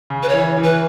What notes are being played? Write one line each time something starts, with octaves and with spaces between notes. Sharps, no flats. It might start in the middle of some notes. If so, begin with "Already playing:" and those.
C#3
B4
E3 C#5
E3
B4